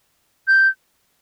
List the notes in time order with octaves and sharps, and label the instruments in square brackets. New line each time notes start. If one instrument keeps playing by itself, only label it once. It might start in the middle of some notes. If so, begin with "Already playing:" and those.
[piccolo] G6